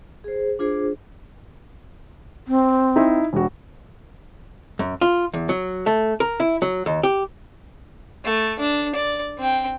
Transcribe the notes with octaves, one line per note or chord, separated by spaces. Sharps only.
G#4 C5
D4 F4 G#4 C5
C4
D#4 E4
E1 F#4
F#2
F4
E2
F#3
A3
A#4
E4
F#3
D#2
G4
A3
D4
D5
C4 G5